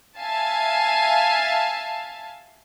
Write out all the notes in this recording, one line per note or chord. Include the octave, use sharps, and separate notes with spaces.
E5 F5 G#5 A5